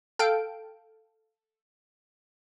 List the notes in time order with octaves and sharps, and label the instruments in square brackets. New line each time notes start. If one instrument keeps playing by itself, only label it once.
[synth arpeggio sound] A4 F5 G5 D7